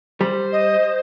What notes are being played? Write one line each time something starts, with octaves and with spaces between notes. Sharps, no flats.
G3 C5
D#5